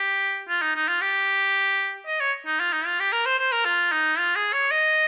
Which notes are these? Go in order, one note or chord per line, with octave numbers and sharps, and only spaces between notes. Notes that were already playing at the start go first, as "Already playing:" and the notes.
Already playing: G4
F4
D#4
D#4
F4
G4
D#5
C#5
D#4
F4
D#4
F4
G4
A#4
C5
C5
A#4
F4
D#4
F4
G#4
C#5
D#5